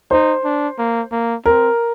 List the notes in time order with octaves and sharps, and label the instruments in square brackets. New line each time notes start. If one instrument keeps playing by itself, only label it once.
[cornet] D#4 [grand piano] C5
[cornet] D4
A#3
A#3
[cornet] C4 [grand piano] A#4